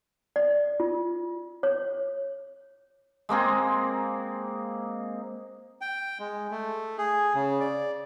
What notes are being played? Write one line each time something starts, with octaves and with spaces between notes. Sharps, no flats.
D5
F4
C#5
G#3 A#3 C4 G#4
G5
G#3
A3
G#4
C#3
D5